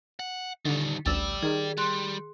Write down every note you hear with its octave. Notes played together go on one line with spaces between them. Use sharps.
F#5
D3 D#3 G3
A1 D2 G4 D5 E6 A6
D#3 G#4
G3 C6 F#6